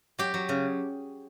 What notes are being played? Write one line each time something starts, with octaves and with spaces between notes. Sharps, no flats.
F#3 G4
F#3
C#3